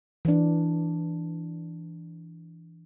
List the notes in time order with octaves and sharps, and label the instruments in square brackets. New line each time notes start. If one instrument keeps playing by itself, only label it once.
[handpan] E3 D4